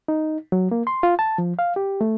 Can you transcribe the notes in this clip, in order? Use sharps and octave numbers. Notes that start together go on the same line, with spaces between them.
D#4
F#3
A#3
C6
F4
A5
F3
F5
G4
A3